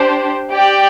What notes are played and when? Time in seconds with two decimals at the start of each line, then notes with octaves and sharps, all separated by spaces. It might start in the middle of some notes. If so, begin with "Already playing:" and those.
Already playing: D4 G4 C5
0.51 G4 D5 G5